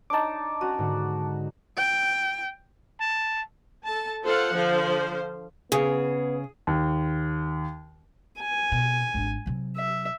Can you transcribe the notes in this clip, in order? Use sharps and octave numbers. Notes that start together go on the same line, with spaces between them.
D4 D#4 A5 D6
C#4 F#4 A#5 D#7
G#2 D3
G5
A5
A4 A5
F4 A4 C5 F5 F#5
D3 F3 C5 F5
C#3 B3 G#4
D#2
G#5
B2
G#1 D4
C3 F#3
E5